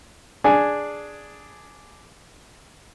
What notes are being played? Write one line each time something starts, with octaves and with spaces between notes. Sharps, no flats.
D4 G#4 G#5